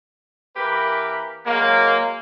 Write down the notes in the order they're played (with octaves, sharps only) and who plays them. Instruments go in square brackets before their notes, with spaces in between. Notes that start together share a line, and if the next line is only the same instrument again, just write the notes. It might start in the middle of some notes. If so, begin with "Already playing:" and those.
[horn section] E3 A#3 G4 A#4 B4
F#3 G#3 A#3